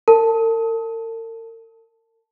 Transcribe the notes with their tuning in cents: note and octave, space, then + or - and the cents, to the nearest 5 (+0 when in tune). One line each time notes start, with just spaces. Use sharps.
A#4 -45 A5 +0